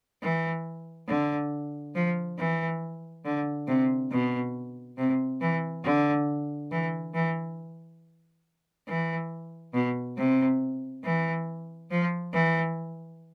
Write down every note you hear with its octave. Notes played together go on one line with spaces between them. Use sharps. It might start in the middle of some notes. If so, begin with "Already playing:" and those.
E3
D3
F3
E3
D3
C3
B2
C3
E3
D3
E3
E3
E3
B2
C3
E3
F3
E3